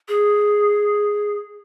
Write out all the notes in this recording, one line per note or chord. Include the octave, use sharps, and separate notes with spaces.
G#4